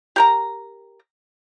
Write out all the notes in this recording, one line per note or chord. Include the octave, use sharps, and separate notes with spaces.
G4 A#4 A#5